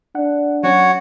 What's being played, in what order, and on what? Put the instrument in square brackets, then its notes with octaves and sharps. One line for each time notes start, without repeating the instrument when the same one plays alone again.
[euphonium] D4 [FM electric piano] F#5
[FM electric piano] F#3 C#4 [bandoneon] F#4 C#5 F#5